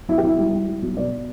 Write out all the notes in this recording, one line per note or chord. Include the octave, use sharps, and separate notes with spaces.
B1 E4
G4
B1 E4
G3
G3
G3
B1
B2 D5